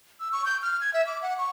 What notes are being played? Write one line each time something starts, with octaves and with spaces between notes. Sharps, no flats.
E6
C#6
G6
F6
G#6
E5
D6
F#5
C#6